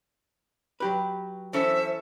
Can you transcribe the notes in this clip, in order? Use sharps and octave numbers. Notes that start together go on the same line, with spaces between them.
F#3 G4 B4
E3 C#4 A4 C5 E5